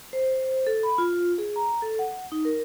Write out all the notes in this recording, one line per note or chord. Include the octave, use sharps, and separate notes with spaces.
C5
A4
B5
F4
G#4
A#5
A4
F#5
D#4
A#4